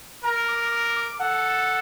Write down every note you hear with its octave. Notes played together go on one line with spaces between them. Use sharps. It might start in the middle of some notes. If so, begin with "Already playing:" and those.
A#4 A#5
D6
D6
D6
A4 F#5